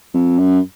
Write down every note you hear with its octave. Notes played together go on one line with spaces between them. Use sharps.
F2
F#2